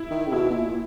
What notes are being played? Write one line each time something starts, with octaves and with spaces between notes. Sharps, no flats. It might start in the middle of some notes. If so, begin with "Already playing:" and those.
Already playing: E4
D#3
C#3
B2 E4
B2
A#2
A#2